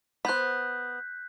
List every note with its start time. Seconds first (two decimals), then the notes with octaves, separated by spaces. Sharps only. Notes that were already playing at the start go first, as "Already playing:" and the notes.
0.25 B3 C5 F#6 G6 B6